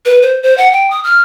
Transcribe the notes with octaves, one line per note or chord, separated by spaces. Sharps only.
B4
C5
C5
F#5
G5
D#6
F6